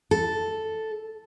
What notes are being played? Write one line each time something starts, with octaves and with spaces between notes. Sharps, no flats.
A4